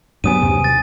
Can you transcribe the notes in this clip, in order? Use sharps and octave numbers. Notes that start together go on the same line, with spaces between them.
G2 F#3 B3 G#5 D#6 D#7
D#2 C3
A6